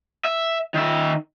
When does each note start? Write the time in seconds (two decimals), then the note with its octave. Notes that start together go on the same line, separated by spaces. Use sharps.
0.24 E5
0.74 D#3 E5